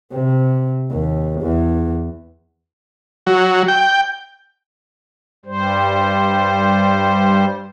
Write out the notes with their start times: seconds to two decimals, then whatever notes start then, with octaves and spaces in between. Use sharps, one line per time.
0.12 C3
0.92 D#2
1.42 E2
3.27 F#3
3.68 G5
5.45 G2 G3 C5